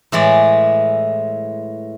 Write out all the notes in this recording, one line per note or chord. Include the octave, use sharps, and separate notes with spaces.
A2 E3 G#3 D5